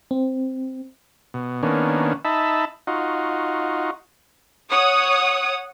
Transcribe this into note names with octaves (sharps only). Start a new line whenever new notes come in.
C4
B2
D#3 A#3 B3 C#4 D4
D#4 E5 A5 B5
D#4 F4 F#4
C#5 F#5 D#6